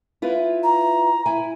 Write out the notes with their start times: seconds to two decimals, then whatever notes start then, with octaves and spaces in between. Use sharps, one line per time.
0.22 E4 F4 B4
0.63 A#5
1.26 E4 G#5